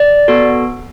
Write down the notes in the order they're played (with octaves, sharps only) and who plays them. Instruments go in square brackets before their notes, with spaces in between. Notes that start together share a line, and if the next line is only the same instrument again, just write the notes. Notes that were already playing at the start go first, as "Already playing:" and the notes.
Already playing: [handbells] D5
B3 F#4 A4